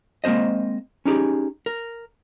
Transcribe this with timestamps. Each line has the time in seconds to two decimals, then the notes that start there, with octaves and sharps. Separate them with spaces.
0.24 G#3 A#3 C4 C5 D#5
1.05 C#4 D#4 G4 G#4
1.66 A#4